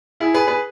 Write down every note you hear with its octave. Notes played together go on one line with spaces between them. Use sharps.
E4 G#4
G#4 B4
G#4 B4